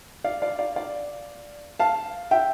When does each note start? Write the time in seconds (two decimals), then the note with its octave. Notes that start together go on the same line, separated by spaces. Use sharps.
0.24 D5 F5
0.42 D5 F5
0.59 D5 F5
0.76 D5 F5
1.79 F5 A5
2.31 E5 G5